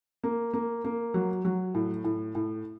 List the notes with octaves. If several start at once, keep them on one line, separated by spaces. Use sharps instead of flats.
A#3
A#3
A#3
F#3
F#3
A2
A2
A2